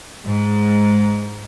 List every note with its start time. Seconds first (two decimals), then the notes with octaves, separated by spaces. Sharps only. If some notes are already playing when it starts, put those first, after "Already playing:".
0.23 G#2